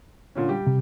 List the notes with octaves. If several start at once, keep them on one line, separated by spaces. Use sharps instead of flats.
A#2 D3 C#4
G3 G4
C3